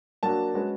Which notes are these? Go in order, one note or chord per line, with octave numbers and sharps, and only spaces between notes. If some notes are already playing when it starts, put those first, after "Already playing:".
F#3 A#3 D4 F#4 A5
G#3 C#4 F#4 B4